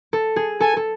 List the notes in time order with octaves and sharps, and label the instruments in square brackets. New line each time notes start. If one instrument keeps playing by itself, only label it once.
[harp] A4
G#4
[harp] A4 [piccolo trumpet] G#5
[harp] A4